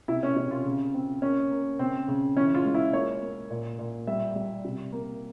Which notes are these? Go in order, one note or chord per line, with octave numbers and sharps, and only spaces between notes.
C3 E4
C#4
C3 C#4
F4
C#3
C4
A#3 C#4
A#3
C#3 C4
C#3
E3 C#4
F4
G#3
E4
A#3 C#5
A#3
A#2
A#2
G3 E5
G3
C3
A#3